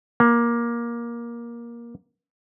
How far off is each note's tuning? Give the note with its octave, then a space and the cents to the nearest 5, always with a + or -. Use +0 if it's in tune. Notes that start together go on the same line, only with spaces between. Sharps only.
A#3 +15